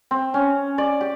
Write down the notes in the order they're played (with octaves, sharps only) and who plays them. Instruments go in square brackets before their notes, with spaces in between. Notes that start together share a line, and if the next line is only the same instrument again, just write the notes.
[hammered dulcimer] C4
C#4
D5
G4